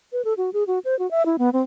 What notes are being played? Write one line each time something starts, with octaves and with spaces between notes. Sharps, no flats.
B4
A4
F#4
G#4
F#4
C5
F#4
E5
E4
B3
C4